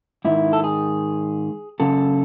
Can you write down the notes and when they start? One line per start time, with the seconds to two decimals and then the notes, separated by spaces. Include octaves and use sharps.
0.25 G#2 D#3 E4
0.53 A4
0.64 G#4
1.80 F#2 C#3 A4